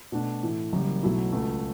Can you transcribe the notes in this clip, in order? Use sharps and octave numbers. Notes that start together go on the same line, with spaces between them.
B2 A3 D4
A2 E3 A3
F#1 F#2 C#3 E3 G3
B1 B2 F#3 A3 E4
C#2 C#3 F#3 A3